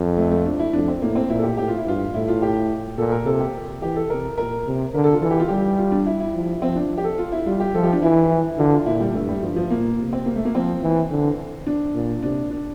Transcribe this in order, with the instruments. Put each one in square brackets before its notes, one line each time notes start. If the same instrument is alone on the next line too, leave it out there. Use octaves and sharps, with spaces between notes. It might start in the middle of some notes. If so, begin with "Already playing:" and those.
Already playing: [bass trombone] F2
[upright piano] A3
A3
D4
E4
[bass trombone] F2 [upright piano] D4
[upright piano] C4
[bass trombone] A2 [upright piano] A#3
[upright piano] C4
[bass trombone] A#2 [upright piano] E4
[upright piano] A4
G4
[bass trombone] A2 [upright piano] G4
[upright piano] F4
E4
[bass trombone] G2 [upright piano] F4
[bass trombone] A2 [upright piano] E4
[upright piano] F4
G4
[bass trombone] A#2 [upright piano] A4
[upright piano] A#4
[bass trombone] C3 [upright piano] A4
[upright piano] G4
[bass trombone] E3 [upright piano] G4
[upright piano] A4
[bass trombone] C3 [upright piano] A#4
[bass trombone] A#2 [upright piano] A#4
[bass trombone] C3
[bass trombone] D3 [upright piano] A#4
[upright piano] A4
F4
[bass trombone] E3 [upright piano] A4
[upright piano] G4
F4
[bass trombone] G3 [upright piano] G4
[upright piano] F4
D4
E4
E4
[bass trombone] F3
[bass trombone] F3 [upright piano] C4
[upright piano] D4
[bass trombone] F3
[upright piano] G4
A4
F4
E4
[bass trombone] G3 [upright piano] F4
[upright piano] G4
[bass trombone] F3 [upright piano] A4
[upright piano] G4
D4
[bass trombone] E3 [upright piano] E4
[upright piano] E4
[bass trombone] D3 [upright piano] F4
[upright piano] F4
[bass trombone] A#2 [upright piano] E4
[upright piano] G3
[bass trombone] G2 [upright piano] A3
[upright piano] G3
[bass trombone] G2 [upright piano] F3
[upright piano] F3
[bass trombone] A#2 [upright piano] A#3
[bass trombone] C3
[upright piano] C4
A#3
A3
A#3
[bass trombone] F3 [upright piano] C4
[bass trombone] E3
D3
[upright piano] D4
[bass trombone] A#2
[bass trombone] C3 [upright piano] D4
[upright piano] D4